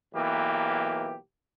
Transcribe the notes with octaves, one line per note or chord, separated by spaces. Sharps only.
B1 E3 A#3 B3 G4